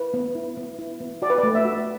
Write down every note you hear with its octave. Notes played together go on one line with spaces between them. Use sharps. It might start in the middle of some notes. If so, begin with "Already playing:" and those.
Already playing: E4 B4
B3
E4
B3
E4
B3
F#4 D5
B4
D5
A3
E5
F#4